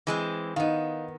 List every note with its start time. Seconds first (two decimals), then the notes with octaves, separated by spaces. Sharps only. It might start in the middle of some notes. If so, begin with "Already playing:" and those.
0.07 E3 G#3 C4
0.56 D#3 B3 D#4 F5